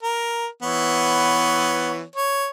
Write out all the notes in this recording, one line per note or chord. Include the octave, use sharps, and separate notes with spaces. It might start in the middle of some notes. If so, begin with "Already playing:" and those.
A#4
E3 B3 C#5
C#5